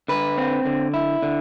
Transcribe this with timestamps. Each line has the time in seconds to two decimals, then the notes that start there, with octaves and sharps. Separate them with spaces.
0.08 D3 B4
0.37 C4
0.65 D3
0.94 E4
1.22 D3